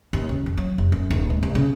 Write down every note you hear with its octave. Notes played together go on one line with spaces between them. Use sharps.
D#2
C#3
F2
F#3
F1
F#2
D1
G#3
C2
C#3